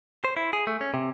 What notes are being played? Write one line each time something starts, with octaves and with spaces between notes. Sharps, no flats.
C5
E4
G#4
A3
C#4
C3